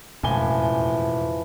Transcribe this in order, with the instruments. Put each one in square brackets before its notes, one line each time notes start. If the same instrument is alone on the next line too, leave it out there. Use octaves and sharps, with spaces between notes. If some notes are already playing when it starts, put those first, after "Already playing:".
[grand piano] E1 G#5 G7 [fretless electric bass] F2 A2 C#3 [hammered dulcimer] E3 F3